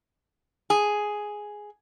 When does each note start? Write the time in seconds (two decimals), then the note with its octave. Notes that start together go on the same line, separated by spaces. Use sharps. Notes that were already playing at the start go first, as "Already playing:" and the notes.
0.70 G#4